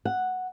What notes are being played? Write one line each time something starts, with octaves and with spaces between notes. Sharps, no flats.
F#5